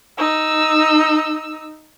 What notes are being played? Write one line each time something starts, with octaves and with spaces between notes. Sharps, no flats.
D#4 E6